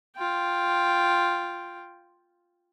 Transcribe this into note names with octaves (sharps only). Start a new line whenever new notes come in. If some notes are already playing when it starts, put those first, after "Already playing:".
F4 G5